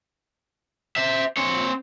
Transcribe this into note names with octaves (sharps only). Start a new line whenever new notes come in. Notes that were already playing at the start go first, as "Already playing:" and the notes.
C5 E5
C4 C#5